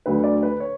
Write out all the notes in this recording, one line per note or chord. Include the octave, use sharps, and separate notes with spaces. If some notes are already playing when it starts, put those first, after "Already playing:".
D2 D3 F#3 B4
D5
B4
C#5